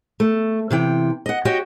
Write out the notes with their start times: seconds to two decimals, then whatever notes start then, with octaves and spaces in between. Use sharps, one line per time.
0.20 A3
0.71 C3 E3 G5
1.26 D#5 F#5
1.45 F#4 G4 C#5 D#5 G5